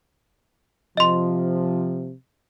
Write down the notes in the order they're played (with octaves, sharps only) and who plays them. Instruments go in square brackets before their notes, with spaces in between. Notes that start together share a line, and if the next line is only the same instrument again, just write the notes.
[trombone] C3 [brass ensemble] F3 [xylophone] D#5 C6